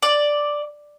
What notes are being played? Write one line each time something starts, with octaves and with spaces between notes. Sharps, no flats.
D5